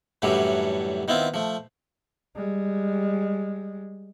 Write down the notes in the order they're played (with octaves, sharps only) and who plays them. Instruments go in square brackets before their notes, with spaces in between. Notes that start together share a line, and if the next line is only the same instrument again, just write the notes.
[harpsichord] F#2 A2 D3 E3 F#3 G3
D#3 B3 C4 E4 F4
F3 A3
[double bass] G3 G#3